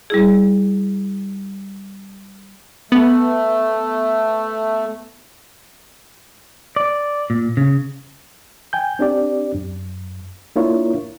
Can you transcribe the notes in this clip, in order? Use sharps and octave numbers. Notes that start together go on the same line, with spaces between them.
G3 E4 G#4
A3 B3
D5
A#2
C#3
G5 G#5 G6
C4 D4 G4 D5
F#2
A#3 D4 E4 F4 A#4 C#5